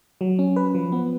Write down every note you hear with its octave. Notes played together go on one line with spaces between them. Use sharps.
F#3
C#4
B4
F3
B3